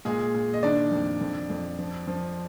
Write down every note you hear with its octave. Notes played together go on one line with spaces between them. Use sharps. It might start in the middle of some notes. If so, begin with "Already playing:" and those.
A#2 G#3 G#4
A#2
D#5
D#3 D4 D5
F2
F2
F2
F3
F3